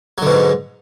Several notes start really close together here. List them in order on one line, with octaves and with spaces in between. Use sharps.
F#3 D3 B2 G#2